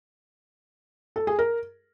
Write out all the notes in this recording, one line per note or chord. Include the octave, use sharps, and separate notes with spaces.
A4
G#4
A#4